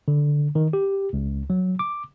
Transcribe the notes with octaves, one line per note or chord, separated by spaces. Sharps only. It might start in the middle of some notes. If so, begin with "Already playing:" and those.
D3
D#3
G4
C#2
F#3
D6